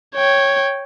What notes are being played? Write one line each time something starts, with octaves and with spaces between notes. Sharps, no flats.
C#5 G5